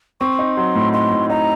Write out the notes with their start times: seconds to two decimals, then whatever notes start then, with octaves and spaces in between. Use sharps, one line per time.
0.21 C4 C#6
0.39 D#4
0.56 F#3 C6
0.75 A2
0.93 D#4 C6
1.11 A2
1.30 D#4 A#5